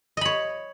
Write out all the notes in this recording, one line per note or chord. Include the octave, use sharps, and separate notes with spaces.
C#5 D#5 B5